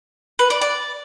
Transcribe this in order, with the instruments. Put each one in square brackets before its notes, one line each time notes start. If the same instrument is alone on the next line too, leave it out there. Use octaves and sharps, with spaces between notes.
[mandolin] B4
D5
D5